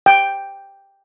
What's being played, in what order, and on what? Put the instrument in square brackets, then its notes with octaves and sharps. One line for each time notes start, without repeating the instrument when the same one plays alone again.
[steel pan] G5